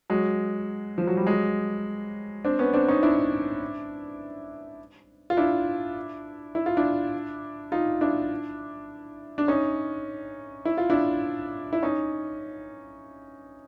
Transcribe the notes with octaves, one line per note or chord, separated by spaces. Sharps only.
F#3 G#3
F3
F#3
G3
F#3 G#3
C4 D4
B3 C#4
C4 D4
C#4 D#4
D4 E4
F4
D4 E4
E4
F4
D4 E4
D#4 F4
D4 E4
D4
C#4 D#4
E4
F4
D4 E4
E4
C#4 D#4